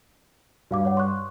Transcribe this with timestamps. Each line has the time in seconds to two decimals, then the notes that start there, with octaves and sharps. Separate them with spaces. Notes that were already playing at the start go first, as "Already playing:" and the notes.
0.71 G2 F#4 F5 D6
0.85 C#5 F#5
0.97 C6 C#6 F#6